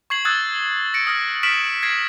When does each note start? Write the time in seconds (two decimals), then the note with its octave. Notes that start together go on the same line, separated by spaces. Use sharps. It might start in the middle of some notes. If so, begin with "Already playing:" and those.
0.10 C#6 G#6 C7 F#7
0.25 D#6 E6 F#6 G#6 A6
0.94 A#6 C#7 D7
1.07 D#6 F6 A#6
1.43 C#6 F6 B6 D7 E7 F#7
1.83 G#6 A#6 C7 D7